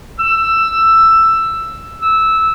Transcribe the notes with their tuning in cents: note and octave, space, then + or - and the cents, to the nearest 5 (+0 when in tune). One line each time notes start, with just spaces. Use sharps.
E6 +10
E6 -10